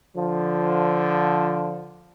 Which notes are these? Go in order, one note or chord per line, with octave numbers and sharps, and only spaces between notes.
D3 F3